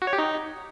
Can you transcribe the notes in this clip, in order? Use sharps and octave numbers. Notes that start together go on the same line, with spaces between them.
F#4
C#5
G4
D#4